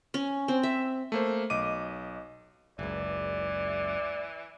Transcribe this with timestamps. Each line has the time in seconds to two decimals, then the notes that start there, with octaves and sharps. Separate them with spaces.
0.14 C#4
0.48 C4
0.63 E5
1.12 A3 A#3 C5
1.50 B1 D#5 D6 D#7
2.79 F#1 C#2 E3 D5